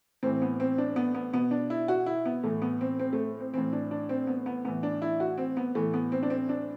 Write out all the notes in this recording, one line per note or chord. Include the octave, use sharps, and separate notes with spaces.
A2 E3 C4
B3
C4
D4
B3
B3
B2 B3
D4
E4
F#4
E4
B3
A2 E3 A3
B3
C4
C4
A3
C4
A2 E3 C4
D4
D4
C4
B3
B3
A2 E3 B3
D4
E4
F#4
C4
B3
A2 E3 A3
B3
C4
D4
C4
D4